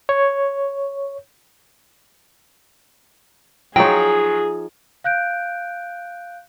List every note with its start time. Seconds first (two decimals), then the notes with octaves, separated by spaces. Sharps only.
0.09 C#5
3.76 F3 F#3 D#4 F4 G#4 C#5 G5
5.04 F5 F#6 G6 D7